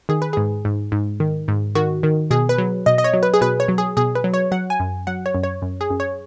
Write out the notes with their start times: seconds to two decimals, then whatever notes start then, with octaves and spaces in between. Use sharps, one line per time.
0.09 D#3 G#4
0.22 B4
0.33 G#2 G#4
0.65 G#2
0.92 G#2
1.20 D#3
1.48 G#2
1.75 D#3 F#4
2.03 D#3
2.31 B2 G#4
2.49 B4
2.58 F#3
2.86 B2 D#5
2.98 D#5
3.04 C#5
3.13 F#3
3.23 B4
3.34 G#4
3.41 B2 B4
3.60 C#5
3.68 F#3
3.78 G#4
3.97 B2 G#4
4.16 B4
4.24 F#3
4.34 C#5
4.52 F#3 F#5
4.70 G#5
4.80 F#2
5.07 F#3 F#5
5.26 C#5
5.35 F#2
5.43 C#5
5.62 F#2
5.81 G#4
5.90 F#2
6.00 C#5